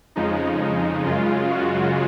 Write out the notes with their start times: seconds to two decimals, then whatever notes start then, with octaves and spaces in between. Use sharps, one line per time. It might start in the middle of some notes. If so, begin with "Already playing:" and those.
0.16 F2 C#3 F3 G#3 D#4
1.06 F#2 C#3 G#3 F4
1.51 F#4